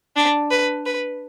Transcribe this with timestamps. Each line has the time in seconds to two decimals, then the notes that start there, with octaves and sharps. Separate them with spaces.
0.17 D4
0.51 B4
0.86 B4